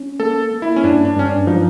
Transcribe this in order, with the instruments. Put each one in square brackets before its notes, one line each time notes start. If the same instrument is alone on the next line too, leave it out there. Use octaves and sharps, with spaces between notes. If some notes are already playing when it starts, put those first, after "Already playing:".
Already playing: [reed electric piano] C#4
[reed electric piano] A#3 [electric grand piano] A4
[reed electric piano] A#3
[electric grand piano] E4
C#4
[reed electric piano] G2 [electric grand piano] D4
[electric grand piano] D4
[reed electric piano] G2 [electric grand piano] C#4
[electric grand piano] D4
[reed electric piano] F3 [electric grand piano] D#4